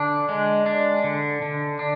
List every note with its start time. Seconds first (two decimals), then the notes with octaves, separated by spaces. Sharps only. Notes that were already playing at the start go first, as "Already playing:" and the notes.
Already playing: D3 D4
0.29 G#3
0.66 D4
1.04 D3
1.42 D3
1.79 D4